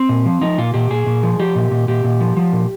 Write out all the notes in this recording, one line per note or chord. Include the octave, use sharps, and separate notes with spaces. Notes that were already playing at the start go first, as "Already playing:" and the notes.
Already playing: C4
A#2
F3
F3 D#4
A#2 F4
A#2 G4
A#2 G#4
A#2
F3
F3 G4
A#2
A#2
A#2 G4
A#2
F3
F3
A#2